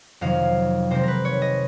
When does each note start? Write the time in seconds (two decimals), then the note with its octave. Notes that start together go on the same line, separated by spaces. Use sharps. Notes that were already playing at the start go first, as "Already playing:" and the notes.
0.21 F2 C3 D#3 F#3 F5
0.90 C3 D#3 G#3 C4 C5
1.03 A#4 B4
1.25 C#5
1.42 D#5